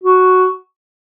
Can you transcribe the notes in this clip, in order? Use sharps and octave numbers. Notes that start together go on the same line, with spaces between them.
F#4